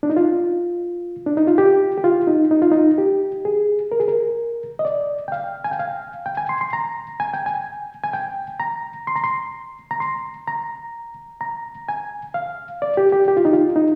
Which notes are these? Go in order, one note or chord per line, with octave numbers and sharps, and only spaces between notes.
D4
D#4
F4
D4
D#4
F4
G4
G4
F4
D#4
D#4
F4
D#4
G4
G#4
A#4
G#4
A#4
D#5
D5
G5
F5
G#5
G5
F5
G5
G#5
C6
C6
A#5
G#5
G5
G#5
G#5
G5
A#5
C6
A#5
C6
A#5
C6
A#5
A#5
G#5
F5
D5
G4
G4
G4
F4
D#4
F4
D#4